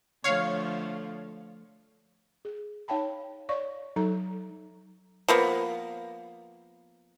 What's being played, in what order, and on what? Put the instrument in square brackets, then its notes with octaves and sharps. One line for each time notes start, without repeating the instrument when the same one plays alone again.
[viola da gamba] D3 F3 A3 [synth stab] C#5 F5
[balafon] G#4
D#4 C#5 F5 G5 A5 B5
C#5 D5 F5 C#6
F#3 D#4 A4 A#5
[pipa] F3 A#3 B3